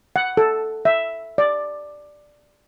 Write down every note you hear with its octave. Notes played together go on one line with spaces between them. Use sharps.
F#5
A4
E5
D5